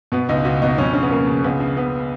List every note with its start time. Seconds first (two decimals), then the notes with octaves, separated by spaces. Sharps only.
0.12 B2 B3
0.29 C#2 D#4
0.45 C#2 F#4
0.62 B2 D#4
0.78 F2 C#4
0.93 C#3 C#4
1.03 B3
1.11 C#3 A#3
1.27 C#3
1.44 C#2 B3
1.60 C#3
1.77 C#3 B3